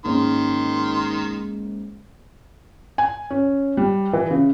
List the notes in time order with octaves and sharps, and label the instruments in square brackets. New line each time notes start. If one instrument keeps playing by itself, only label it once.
[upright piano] G#2 A#3 C#4 [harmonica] D#3 C6
[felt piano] G#5
C#4
G3
E3
C#3